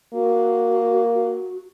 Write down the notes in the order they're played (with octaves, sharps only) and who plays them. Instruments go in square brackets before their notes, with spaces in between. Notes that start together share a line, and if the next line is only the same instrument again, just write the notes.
[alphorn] A#3 [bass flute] F#4
[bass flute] F#4